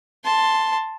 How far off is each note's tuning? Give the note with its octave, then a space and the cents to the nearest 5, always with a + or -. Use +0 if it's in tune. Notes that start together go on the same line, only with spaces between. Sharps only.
A5 +5 C6 +0